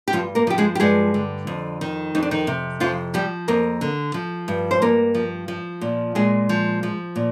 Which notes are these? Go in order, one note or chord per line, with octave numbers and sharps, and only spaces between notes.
G4
G2 F3 F4
A#3 A#4
F3 G4
G#3 G#4
G4
G2 G#3 G#4
D3
F2
D#3
F2 D#4
D4
D#3 D#4
C3
F2 F3 F4
F3 G3 G4
F2 A#3 A#4
D3
F3
G2
C5
G2 A#3 A#4
F3
F3
A#2
A#2 G#3 G#4
F3
F3
A#2